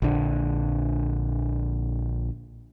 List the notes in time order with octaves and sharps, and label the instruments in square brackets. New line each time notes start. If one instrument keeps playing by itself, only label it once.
[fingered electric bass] A#1 D3